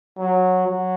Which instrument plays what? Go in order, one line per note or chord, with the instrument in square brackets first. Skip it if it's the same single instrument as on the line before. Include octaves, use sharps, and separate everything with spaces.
[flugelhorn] F#3
F#3